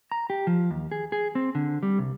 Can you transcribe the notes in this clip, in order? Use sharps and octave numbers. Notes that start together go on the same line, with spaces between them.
A#5
G4
F3
D#2
G#4
G#4
C4
D3
G3
C2